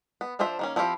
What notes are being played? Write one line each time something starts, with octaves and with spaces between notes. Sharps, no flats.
B3
F3 D4 F4 C5 E5
D#3 A#3 C#4
F3 C4 E4 G4 F5